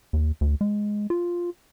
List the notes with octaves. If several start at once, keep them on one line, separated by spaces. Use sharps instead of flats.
D#2
D2
G#3
F4